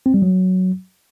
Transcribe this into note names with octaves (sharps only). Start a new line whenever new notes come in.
C4
G3
F#3